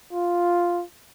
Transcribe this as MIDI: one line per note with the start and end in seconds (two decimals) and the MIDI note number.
0.13 0.83 65